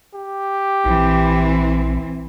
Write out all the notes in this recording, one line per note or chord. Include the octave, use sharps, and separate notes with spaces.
G4
A#1 E3 C4